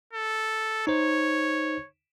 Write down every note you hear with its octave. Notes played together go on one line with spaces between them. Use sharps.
A4
D#4 C5 C#5